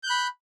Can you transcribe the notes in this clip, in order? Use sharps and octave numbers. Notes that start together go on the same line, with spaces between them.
B5 F#6 G6